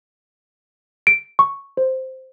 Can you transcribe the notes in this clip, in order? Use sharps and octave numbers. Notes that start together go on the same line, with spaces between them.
D7
C#6
C5